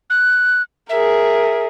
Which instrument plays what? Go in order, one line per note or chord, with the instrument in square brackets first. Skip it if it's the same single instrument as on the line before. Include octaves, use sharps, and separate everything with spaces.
[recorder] F#6
[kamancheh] G#4 A#4 [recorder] E5